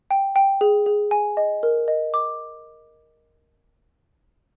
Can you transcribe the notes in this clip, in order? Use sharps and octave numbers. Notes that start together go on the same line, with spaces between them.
G5
G5
G#4
G#4
G#5
D#5
A#4
D#5
D6